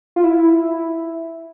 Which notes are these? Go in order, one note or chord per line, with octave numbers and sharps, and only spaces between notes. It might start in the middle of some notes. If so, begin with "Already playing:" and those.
F4
E4